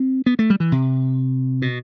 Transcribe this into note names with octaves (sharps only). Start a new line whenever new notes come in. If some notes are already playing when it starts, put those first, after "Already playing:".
Already playing: C4
B3
A3
G3
E3
C3
B2